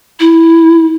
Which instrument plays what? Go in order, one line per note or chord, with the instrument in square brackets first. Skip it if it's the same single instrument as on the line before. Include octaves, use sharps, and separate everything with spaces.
[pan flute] E4